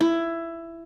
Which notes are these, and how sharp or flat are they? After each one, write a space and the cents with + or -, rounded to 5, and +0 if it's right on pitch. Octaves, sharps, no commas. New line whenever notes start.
E4 +15